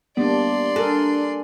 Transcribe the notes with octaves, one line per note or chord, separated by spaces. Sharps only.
G3 A#3 B3 D4 D5 C6
D4 A4 A#4 G#5